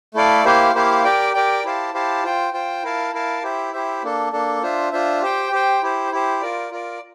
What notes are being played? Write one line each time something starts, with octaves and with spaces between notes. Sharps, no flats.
A3 E4 A4 D5 F5
A#3 E4 G4 C5 F5
A#3 E4 G4 C5 F5
G4 A#4 D5 G5
G4 A#4 D5 G5
E4 G4 C5 F5 A5
E4 G4 C5 F5 A5
F4 C5 G5
F4 C5 G5
E4 A#4 F5 A5
E4 A#4 F5 A5
E4 G4 C5 E5
E4 G4 C5 E5
A#3 D4 A4
A#3 D4 A4
D4 F4 C5 E5
D4 F4 C5 E5
G4 C5 G5
G4 C5 G5
E4 G4 C5
E4 G4 C5
F4 A#4 D5
F4 A#4 D5